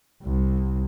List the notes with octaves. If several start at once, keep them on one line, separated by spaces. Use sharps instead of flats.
C2